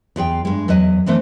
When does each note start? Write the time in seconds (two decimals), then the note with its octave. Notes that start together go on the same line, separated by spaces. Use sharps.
0.16 E2 F4 G#4 G5
0.45 G2 G#3
0.68 E2 F#3 B4 D#5
1.06 E3 A3 B3 C4 D4